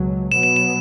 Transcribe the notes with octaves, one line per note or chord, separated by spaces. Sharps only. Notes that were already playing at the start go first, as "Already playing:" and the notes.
Already playing: C#2 B2 F#3
B2 F#3 B3 E7
E7
E7